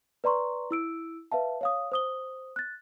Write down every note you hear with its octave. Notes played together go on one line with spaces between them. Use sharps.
B4 D5 A#5 C6 C#6
E4 E6 D7
B4 E5 F5 A5
C#5 F5 D#6
C5 D#6 G7
F#6 A6